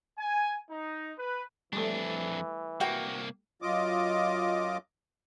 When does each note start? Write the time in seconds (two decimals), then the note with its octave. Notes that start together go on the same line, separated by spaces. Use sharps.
0.18 G#5
0.70 D#4
1.17 B4
1.73 F2 E3 G3 A3 D4
2.80 C2 A#3 F#4 G5
3.62 F#2 F4 D#5 D6